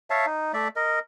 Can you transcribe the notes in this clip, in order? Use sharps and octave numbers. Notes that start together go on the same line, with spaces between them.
C#5 E5 F5 A5
D#4
A3 D5 E5
A#4 D#5